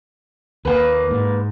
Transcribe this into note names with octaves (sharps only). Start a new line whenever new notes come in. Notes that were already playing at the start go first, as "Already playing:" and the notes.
D#2 A#3 B4
G#2